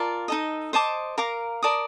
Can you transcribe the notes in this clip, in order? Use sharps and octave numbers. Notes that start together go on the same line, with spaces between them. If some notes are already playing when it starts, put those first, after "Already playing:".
Already playing: F4 A#4 D5 A5
D#4 A4 D#5
C5 D#5 A5 D6
A#4 F5 A#5 D6
A#4 D5 A5 D#6